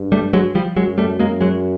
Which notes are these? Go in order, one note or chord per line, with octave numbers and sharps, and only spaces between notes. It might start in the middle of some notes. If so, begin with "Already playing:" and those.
Already playing: G2
G3 A3
F#3 G#3
F3 G3
F#2 F#3 G#3
G3 A3
F#2 G#3 A#3
F#3 G#3